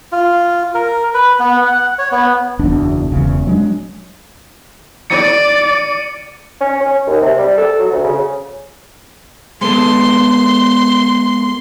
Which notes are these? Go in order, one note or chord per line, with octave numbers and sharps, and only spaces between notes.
F4
A#4
B4
B3
F#5
C#5
B3
F#1 E2 B2 D4
E1 E2 C#3
F#3 G#3 D4
D5 C#7 D#7
C#4
C#4
D#2
C3
G3
A4
F#3
D2
C#3
G#3 B3 A4 C6